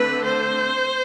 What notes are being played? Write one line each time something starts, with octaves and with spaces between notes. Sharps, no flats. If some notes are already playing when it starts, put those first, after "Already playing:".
Already playing: D3 A3 C4 B4
C5